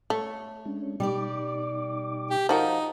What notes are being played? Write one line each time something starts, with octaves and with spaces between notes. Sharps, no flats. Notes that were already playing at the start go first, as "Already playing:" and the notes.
A3 C#5
G#3 C#4 D4
B2 G3 D#4 G4 D5 D6
G4
F3 D#4 F#4 A#4